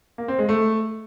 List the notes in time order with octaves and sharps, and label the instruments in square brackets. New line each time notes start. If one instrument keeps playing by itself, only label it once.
[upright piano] A#3
C4
G#3
A3